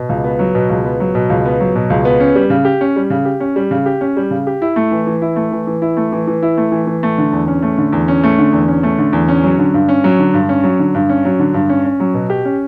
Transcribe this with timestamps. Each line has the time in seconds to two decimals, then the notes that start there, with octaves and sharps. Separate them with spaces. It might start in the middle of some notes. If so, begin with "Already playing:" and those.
Already playing: B2
0.09 C#2
0.24 B3
0.39 F#3
0.55 B2
0.70 C#2
0.84 B3
1.00 F#3
1.15 B2
1.30 C#2
1.45 B3
1.60 F#3
1.76 B2
1.90 C#2
2.05 B3
2.20 C#4
2.35 G3
2.50 C#3
2.65 G4
2.81 C#4
2.96 G3
3.10 C#3
3.25 G4
3.40 C#4
3.56 G3
3.71 C#3
3.86 G4
4.01 C#4
4.17 G3
4.31 C#3
4.47 G4
4.62 E4
4.76 A3
4.91 E3
5.07 E3
5.22 E4
5.36 A3
5.52 E3
5.67 E3
5.82 E4
5.97 A3
6.12 E3
6.27 E3
6.42 E4
6.57 A3
6.72 E3
6.87 E3
7.03 A3
7.18 D3
7.32 E2
7.48 C#4
7.62 A3
7.78 D3
7.93 E2
8.08 C#4
8.23 A3
8.38 D3
8.53 E2
8.68 C#4
8.83 A3
8.98 D3
9.13 E2
9.28 C#4
9.44 F#3
9.59 D3
9.74 G2
9.88 C#4
10.04 F#3
10.19 D3
10.34 G2
10.49 C#4
10.64 F#3
10.79 D3
10.94 G2
11.09 C#4
11.25 F#3
11.39 D3
11.54 G2
11.69 C#4
11.85 C#4
12.00 F#3
12.14 B2
12.30 G4
12.45 C#4